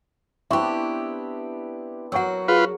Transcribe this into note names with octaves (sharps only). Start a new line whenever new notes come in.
B3 C4 D4 E4 G4 E5 C6 C#6
F#3 F#4 A#4 C#5 F#5 G5 C#6 E6
F4 G#4 B4